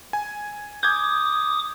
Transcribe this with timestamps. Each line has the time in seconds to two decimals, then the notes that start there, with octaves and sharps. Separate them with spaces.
0.13 G#5
0.83 D6 D#6 G6 G#6